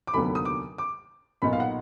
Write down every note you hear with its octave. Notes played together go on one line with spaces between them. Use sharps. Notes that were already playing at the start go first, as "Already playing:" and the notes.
D6
F1 D#2 D3 F#3 B3 B5
D#6
D6
D6
B1 A#2 F#3 B3 D#4 B5
F5
F#5